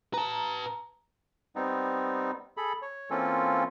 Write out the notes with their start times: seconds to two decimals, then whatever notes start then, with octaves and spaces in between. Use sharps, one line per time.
0.14 B4 A5 A#5
1.56 G3 B3 C4 D#4
2.57 G#4 A4 B5
2.82 C#5
3.10 E3 A#3 C4 C#4 F4 A4